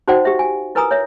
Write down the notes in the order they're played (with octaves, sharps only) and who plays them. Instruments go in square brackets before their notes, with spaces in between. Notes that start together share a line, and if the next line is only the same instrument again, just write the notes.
[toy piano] D#4 F#4 C5 D5 F#5 G5
G4 E5
G#5
E4 A#4 B4 G#5 A#5 D#6
C#5 E5